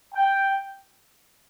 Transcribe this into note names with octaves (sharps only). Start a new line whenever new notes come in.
G5